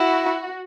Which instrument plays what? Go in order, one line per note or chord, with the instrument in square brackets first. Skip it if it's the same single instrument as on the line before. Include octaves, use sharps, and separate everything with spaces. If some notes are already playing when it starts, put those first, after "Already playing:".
Already playing: [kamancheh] E4 [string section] F#4